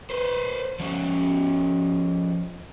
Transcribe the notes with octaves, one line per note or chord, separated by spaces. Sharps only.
B4 C5
F3 C#4